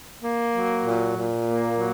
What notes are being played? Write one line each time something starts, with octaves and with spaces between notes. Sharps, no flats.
A#3
F#3
A#2
A#2
A#3
F#3